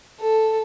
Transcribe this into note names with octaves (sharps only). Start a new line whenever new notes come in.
A4